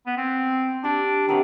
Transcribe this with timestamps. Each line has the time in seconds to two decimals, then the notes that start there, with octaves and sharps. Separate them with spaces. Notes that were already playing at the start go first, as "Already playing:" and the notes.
0.06 B3
0.17 C4
0.84 D4 G4
1.29 C3 D#3 F#4 A4